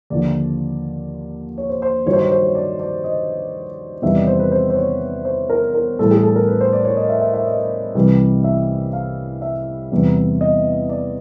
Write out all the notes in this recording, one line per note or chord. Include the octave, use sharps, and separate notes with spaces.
D#2 D3 F3 D5
C#5
C5
C5
G2 D#3 F#3 C#5
C5
C#5
C5
C#5
D5
D5
D#5
E2 C3 D#3 G3 E5
D5
C5
B4
C5
C5
C#5
C5
A#4
A#4
A2 E3 G3 A4
G#4
A4
A#4
B4
C5
D5
C#5
D#5
E5
E5
E5
D#5
C2 C3 E3 G3
E5
F5
E5
E2 C3 E3 G3
D#5
D5